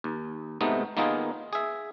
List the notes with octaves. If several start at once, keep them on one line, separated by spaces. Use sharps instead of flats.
D#2
G#2 C3 A3 B3 D#4
D#3 A#3 B3 D#4 F4 G#4
G#4 E5